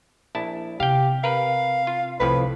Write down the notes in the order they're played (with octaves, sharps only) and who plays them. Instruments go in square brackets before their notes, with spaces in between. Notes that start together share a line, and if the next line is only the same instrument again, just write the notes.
[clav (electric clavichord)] A#1 E4 A5
[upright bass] C3 [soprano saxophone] G4 [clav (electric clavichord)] F5 G5
[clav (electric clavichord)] A#4 B4 [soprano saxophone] F5
[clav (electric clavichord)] F4
[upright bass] C2 [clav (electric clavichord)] F2 A2 F3 [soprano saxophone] B4